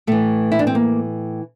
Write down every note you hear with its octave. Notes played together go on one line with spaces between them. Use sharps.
A2 E3 A3
E4
D4
C4
A#3